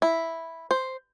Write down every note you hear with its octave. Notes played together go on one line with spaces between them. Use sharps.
E4
C5